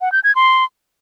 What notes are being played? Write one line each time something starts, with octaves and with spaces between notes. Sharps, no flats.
F#5
G6
G#6
C6